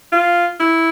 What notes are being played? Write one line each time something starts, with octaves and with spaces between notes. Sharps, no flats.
F4
E4